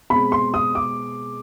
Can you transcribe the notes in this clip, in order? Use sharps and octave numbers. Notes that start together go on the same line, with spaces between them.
B2 G#3 C4 B5
C6
D#6
D6